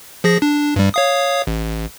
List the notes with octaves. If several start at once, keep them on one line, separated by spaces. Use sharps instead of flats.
F3 G#4 A#6
D4
G2 G3
C#5 F5 D#6
A1